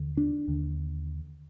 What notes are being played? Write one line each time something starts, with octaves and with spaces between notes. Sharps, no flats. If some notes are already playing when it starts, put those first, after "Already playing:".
Already playing: D#2 D3
D4
D#2 D3